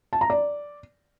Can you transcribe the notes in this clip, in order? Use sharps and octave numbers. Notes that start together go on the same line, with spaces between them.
A5
A#5
D5